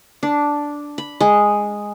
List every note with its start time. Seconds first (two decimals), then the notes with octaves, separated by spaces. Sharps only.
0.23 D4
0.98 B5
1.21 G#3